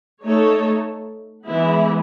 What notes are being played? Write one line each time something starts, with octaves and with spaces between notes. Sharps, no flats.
A3 D#4 A4 C#5
E3 G#3 B3 E4